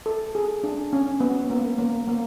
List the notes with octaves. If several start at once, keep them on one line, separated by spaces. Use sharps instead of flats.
A4
G#4
D4
C#4
B3
A#3
A#3
A#3